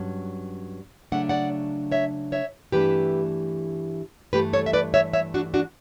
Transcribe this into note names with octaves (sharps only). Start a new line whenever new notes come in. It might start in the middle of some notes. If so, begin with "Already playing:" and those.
Already playing: G2 F#3 C#4
C#3 F#3 A3 D4 F#5
D5 F#5
C#5 E5
C#5 E5
G2 E3 A3 D4 G4 B4
G2 E3 A3 G4 B4
A4 C#5
E5
B4 D5
C#5 E5
C#5 E5
D4 F#4
D4 F#4